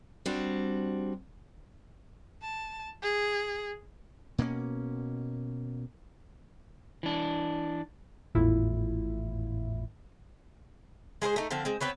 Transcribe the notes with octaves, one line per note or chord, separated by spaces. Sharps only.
G3 C4 D4 F#4
A5
G#4
B2 A#3 B3 C#4
E3 D4
G#1 E2 A2 E4 F4
G#3 G#4 A#4 C5
A3 D#4
D3 F3 C4 F5
G#3 C4
B3 C4 B4 C#5